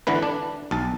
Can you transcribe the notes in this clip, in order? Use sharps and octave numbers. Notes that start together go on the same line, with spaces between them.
D3 E3 B4
D4
B1 A5